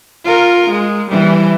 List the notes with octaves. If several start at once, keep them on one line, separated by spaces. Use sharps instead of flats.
F4 A#4
G#3
E3 G3